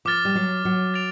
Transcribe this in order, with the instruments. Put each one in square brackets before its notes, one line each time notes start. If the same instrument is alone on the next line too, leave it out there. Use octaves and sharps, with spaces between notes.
[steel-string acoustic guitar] F3 [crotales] D6 F6 A6
[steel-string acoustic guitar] G3
F#3
F#3
[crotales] A6 D7 F7